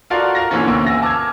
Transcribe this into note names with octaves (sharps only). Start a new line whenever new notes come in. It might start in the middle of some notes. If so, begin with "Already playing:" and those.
F4 F#4 A4 A#4 D5 F5
A#4 F5 A#6
A#2 D3 E3 C4 C#4
D2 B2 A#3 E6
G#5 E6 A#6
A5 D6 E6 F6 G#6